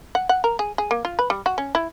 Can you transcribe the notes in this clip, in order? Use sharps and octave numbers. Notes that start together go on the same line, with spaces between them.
F#5
F#5
A#4
G#4
G#4
A#3
F4
B4
G3
F#4
C#4
E4